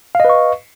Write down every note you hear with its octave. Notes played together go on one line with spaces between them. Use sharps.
B4 D#5 F5 C#6